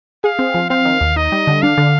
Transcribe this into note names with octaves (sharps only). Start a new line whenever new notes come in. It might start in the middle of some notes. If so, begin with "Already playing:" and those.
G#4 F5
C4
F3
C4 F5
D#3
D#2
D#4 D#5
G3
D3
D4 F5
D3